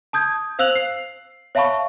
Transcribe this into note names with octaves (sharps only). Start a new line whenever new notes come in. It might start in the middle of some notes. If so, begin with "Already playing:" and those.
A5 D#6 G6 G#6
C5 F5 E6 F#6 F7 F#7
C7
C#5 E5 F5 A5 B5 C#6